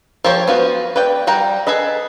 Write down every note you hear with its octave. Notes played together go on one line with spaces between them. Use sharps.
F3 G4 C5 C#5
B3 F4 F#4
B4 D5 G5
G3 F#5 G5 A#5
G#4 A4 B4 D#5